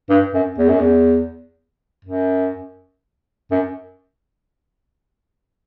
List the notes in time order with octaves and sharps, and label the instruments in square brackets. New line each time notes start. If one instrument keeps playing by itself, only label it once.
[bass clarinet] G2
F#2
E2
F#2
E2
F#2
F#2